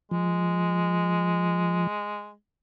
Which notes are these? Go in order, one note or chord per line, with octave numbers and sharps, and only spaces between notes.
F3 G#3